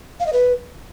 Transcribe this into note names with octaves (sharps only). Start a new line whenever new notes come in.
F5
D#5
B4